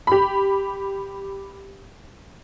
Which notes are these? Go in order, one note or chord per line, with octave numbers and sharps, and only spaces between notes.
G4 B5